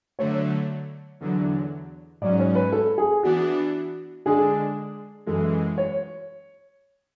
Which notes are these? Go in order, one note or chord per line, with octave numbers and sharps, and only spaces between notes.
D3 F#3 A3 C#5
E2 D3 F#3
G#2 F#3 C#4 D5
C#5
B4
A4
G#4
E3 B3 D4 F#4
D3 G#3 D4 G#4
F#2 E3 G#3 A4
C#5